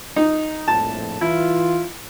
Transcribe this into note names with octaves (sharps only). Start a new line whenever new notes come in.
D#4
A#1 F2 A2 A5
E3 E4 F4